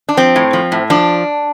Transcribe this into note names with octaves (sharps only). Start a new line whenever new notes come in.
D4
F3 C4
A2
F3
A2
F3 D4